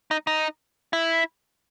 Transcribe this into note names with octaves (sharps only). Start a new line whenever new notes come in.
D#4
D#4
E4